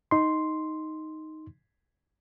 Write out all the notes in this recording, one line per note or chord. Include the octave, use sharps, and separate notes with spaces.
D#4 C6